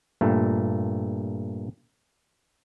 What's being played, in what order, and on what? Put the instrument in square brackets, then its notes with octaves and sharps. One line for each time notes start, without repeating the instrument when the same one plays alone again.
[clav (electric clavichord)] G2 A#2 A3